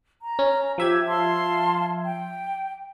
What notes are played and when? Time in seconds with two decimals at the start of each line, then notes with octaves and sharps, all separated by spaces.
0.21 A#5
0.39 C#4
0.78 F3 G4 E5 G#6
1.09 F5 A5 C6
2.04 G5